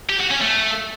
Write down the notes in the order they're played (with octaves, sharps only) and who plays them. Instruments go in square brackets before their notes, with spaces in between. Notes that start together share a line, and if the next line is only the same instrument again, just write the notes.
[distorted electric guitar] G4
F#4
C#4
A3